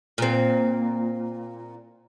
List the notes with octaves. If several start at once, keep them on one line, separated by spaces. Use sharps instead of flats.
A#2 C4